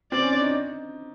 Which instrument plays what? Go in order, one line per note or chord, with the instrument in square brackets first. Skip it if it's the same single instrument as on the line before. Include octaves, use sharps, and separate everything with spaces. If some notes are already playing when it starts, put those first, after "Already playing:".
[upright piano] C4 [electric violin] D5
[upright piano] C#4
D4
D#4
D#4